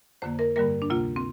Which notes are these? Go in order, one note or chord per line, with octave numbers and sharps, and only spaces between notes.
F2 D3 A#3 C5
A#4
G2 D3 G3 A#3 A#4
D4
D2 C3 A#3 F4
C4